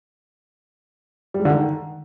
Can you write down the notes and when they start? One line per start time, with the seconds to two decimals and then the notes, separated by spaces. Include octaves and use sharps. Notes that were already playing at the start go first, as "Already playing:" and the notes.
1.34 G3
1.40 G#3
1.45 D3
1.51 D#3